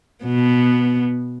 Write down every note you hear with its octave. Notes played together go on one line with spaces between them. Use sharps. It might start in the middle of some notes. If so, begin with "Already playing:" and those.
B2 B3